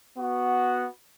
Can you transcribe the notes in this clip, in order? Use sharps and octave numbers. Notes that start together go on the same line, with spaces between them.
B3 F#4